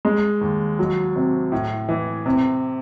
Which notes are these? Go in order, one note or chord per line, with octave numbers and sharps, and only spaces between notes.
G#3
D#2
F#3
C3
A2
E3
C3